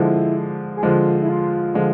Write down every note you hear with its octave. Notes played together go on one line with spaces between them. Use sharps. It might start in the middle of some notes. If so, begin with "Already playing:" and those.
Already playing: D3 F3 G#3 E4
G#4
D3 F3 G#3 F4
E4
F4
D3 F3 G#3